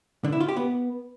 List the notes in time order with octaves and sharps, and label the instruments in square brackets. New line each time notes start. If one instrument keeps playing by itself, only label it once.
[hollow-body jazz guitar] D3
E4
F4
G4
B3